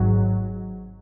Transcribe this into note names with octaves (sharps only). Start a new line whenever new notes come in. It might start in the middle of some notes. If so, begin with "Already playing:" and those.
Already playing: G#1 G#2 F#3